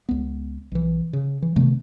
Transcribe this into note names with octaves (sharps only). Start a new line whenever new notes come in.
C#2 B3
B1 E3
C#3
E3
C3 D#3 A3 B3